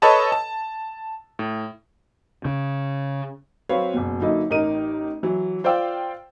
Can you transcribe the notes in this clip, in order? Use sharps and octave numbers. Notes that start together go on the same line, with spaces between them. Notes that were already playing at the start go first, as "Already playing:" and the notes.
A4 B4 C#5 D#5 A5 B5
A5
A2
C#3
F#3 C4 B4 C#5 F5
F#1 B2
D3 F#3 A#3 D#4 E4
A1 D#4 A#4 D#7
E3 F#3
F4 C5 D5 F5 G5 E6